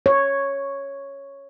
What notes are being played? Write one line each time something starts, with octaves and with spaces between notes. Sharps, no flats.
C#5